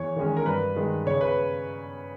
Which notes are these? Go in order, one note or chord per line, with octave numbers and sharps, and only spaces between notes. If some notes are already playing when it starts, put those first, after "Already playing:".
Already playing: E2 C#5
D#3 G#3 C#4
A#4
G2 B4
D#3 G#3
C#3 C#5
B4